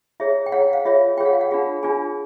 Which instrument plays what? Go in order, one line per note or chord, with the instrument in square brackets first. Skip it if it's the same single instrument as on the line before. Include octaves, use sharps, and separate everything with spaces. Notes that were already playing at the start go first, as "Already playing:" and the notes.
[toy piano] E4 G#4 C#5 E5
G5
E4 G#4 C#5 F#5
F5
F4 G#4 C#5 E5
F4 G#4 C#5 G5
F#5
F5
F#5
D4 F4 G#4
D4 F4 G#4 G#5